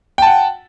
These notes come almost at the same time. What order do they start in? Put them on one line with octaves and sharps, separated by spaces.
G5 A5 F#5